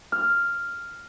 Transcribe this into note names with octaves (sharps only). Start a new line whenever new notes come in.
F6